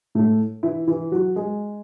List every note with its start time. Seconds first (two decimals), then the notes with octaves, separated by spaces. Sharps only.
0.15 A2 A3
0.63 E3 E4
0.87 E3 E4
1.12 F#3 F#4
1.36 G#3 G#4